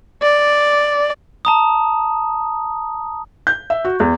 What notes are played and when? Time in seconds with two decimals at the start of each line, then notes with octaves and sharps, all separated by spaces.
0.22 D5
1.45 A5 A#5 D#6
3.47 G6
3.70 E5
3.85 F#4
4.00 E2